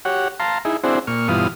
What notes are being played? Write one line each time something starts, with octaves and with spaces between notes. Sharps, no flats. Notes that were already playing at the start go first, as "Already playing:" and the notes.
F#4 G4 C#5 F#5
F5 A5 A#5 C6
D#4 E4 G#4
C4 D4 E4 F#4 G#4 C5
A#2 C#6 F6
G2 B2 E3 F4 D#6 F6